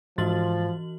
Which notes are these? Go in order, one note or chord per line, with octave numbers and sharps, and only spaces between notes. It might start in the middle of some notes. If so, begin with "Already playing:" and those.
G#2 E3 F3 F#4 C6 A6 F#7